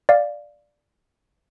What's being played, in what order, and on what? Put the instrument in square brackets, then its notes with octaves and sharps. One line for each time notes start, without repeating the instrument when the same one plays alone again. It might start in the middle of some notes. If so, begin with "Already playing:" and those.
[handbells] D5 F5